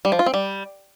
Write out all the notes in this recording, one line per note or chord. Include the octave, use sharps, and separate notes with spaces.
G3
F3
F4
C4
G3